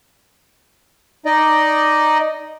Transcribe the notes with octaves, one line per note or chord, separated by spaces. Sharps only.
D#4 D5 D#5